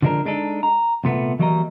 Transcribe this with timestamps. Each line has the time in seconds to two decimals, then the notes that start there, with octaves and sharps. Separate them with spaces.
0.02 D3 F3 G#3 D4 A#4
0.25 G#3 D4 D#4 A4
0.63 A#5
1.04 C2 A#2 A3 B3
1.39 E3 F#3 G3 A#3 D#5 A#5